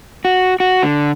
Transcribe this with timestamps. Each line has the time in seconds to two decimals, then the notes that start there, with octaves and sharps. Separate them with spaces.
0.25 F#4
0.60 F#4
0.83 D3